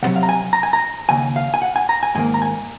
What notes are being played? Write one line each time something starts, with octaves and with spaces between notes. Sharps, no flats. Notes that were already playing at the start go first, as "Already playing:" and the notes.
C#2 C3 F#3 F#5
F5
A#5
G#5
A#5
G#5
A#5
D#2 C#3 G#5
F5
G#5
F#5
G#5
A#5
G#5
G#2 D#3 A#3 G#5
A#5
G#5